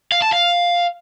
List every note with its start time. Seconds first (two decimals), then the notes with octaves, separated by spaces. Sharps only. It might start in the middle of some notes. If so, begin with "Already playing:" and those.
0.12 F5
0.22 A5
0.33 F5